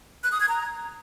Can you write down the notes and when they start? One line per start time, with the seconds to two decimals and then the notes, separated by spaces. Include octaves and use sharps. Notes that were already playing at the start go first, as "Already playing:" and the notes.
0.23 F#6
0.32 D#6
0.40 G#6
0.49 A#5